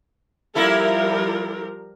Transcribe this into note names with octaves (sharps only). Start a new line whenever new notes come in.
F3 G3 A#3 E4 A4 A#4